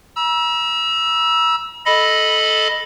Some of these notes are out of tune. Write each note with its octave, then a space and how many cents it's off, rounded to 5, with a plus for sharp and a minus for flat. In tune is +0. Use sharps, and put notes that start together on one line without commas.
A#5 +45 E6 +0
A4 -10 D#5 +0 B5 +0